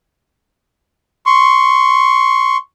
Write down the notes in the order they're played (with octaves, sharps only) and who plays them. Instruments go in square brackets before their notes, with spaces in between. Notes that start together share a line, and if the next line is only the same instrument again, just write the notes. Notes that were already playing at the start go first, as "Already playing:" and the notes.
[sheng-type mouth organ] C6 C#6